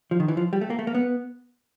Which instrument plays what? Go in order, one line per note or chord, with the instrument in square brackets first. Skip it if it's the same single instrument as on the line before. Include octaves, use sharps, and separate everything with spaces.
[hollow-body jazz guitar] F3
D#3
E3
F3
G3
A3
A#3
A3
A#3
B3